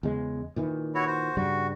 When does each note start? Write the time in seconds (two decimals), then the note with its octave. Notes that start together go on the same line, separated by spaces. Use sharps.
0.03 E2 C#3 G#3
0.56 A#2 D#3 E3
0.95 E4 F#4 C#5
1.07 F#4 C5
1.37 G2 C#3 G3 F#4